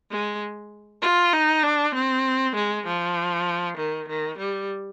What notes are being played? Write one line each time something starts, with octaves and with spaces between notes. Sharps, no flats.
G#3
F4
D#4
D4
C4
G#3
F3
D#3
D#3
G3